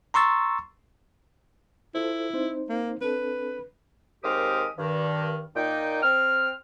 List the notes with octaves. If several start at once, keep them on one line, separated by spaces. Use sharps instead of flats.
A#5 C6 C#6 E6 A6
E4 F4 A4 C5
C4 D#4 C5
A#3
C4 D4 A4 B4
D#2 G#3 C4 G4 A#4 D#6
G2 D#3
A#2 D#4 G5
C4 F6